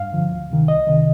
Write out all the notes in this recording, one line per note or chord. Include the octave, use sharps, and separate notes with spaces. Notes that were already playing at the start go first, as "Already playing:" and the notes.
Already playing: G2 F5
D3 F3
D2
C3 D#3
C2 D#5
C3 D#3